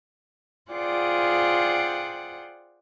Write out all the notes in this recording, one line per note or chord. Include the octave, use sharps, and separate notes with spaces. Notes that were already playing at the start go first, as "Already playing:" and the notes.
F4 G#4 C5 D5 F#5 G5